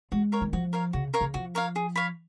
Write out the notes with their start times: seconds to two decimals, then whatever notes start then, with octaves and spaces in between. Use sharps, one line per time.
0.12 G#3 F#4
0.32 A#4 C#5 F5
0.41 D#3
0.53 F3 F#4
0.73 A#4 C#5 F5
0.93 C#3 F#4
1.14 A#4 C#5 F5
1.21 C#3
1.34 F3 F#4
1.55 A#4 C#5 F5
1.76 G#4
1.96 C#5 F5 B5